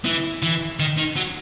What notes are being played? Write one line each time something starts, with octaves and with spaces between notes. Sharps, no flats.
E3
E3
D#3
D#3
F#3